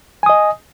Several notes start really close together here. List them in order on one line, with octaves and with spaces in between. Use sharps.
G#5 D#6 D#5